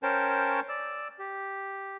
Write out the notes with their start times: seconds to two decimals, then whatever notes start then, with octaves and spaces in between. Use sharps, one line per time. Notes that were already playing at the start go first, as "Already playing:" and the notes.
0.03 C#4 A#4 C5 C#5 G5 A5
0.69 D5 E6
1.19 G4